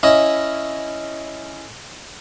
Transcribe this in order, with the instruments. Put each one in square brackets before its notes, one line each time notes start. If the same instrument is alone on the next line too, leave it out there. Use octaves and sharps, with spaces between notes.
[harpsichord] C#4 E4 D#5